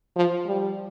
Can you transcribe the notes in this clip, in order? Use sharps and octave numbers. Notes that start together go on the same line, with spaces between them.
F3
G3